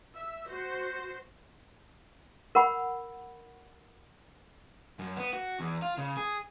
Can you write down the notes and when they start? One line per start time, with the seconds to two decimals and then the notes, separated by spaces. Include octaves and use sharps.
0.15 E5
0.48 F#4 C5
2.55 A#4 F#5 B5
4.99 F#2
5.17 B3
5.33 F#4
5.60 E2
5.82 F4
5.98 C#3
6.17 G#4